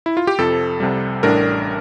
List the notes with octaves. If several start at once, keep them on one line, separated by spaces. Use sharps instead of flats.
E4
F4
G4
F2 C3 F3 A4
C2 C3 G3
A1 A2 G3 D4 A#4